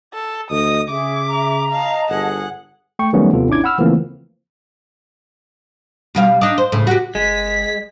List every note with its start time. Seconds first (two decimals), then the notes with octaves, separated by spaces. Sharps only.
0.14 A4
0.51 D2 D#5 D#6
0.89 C#3 G#4 E5 D6
1.27 A#5
1.72 D#5 F5 A5
2.09 G1 G#4 F#5
2.99 A3 G5 C#6 C#7
3.13 D#3 F#3 G3 A3 B3 C#4
3.33 D#2 C3 F3 B3 F4 A4
3.48 G#1 C#4 D4 E4 D6 G#6
3.64 F#5 B5 E6 F6
3.78 C#3 E3 F3 A3 A#3 C4
6.15 B2 G3 F5
6.41 D4 D#4
6.58 C5
6.72 A2 C#3
6.87 F#4 G4
7.15 G1 G#3 B6